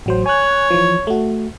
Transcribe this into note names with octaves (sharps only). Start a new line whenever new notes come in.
A1 F#3 C5
C#5 G#5 F#6
E3 F3
A3 F#4